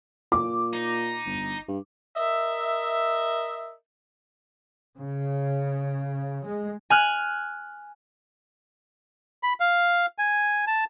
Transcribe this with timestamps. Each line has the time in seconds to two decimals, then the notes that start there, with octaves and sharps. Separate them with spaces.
0.32 A#2 D6
0.73 D#4
1.26 G1
1.68 G2
2.15 A#4 D#5 E5
4.96 C#3
6.45 G#3
6.90 G#5 F6 F#6
9.43 B5
9.60 F5
10.18 G#5
10.67 A5